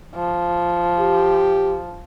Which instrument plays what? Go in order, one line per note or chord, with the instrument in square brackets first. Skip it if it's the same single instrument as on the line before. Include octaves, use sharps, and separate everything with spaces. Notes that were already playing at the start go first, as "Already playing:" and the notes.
[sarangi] F3
[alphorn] G4